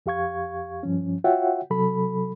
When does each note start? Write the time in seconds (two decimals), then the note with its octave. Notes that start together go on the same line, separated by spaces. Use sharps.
0.06 F2 G4 F5 C#6 G#6
0.83 G2 F3 C#4
1.24 F4 F#4 C#5 E5 F#5 G5
1.70 C3 F#3 A4 B5